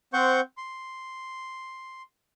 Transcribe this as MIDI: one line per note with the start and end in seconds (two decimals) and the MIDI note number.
0.13 0.40 60
0.13 0.40 72
0.13 0.40 78
0.13 0.40 85
0.13 0.40 91
0.58 2.02 84